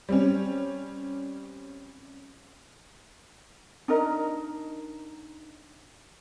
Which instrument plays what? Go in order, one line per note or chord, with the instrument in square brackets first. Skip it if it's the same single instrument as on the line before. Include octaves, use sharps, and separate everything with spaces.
[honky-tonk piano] G3 C4 C#4
[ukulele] D4 D#4 A#4 D#5